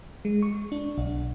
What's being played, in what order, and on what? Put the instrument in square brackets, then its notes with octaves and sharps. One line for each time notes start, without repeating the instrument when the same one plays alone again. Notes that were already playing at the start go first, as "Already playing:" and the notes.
[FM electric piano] G#3
C#6
D4
B1